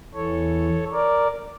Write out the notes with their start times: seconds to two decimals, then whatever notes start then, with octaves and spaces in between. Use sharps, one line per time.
0.14 E2 E3 A4 C#5
0.92 A#4 D5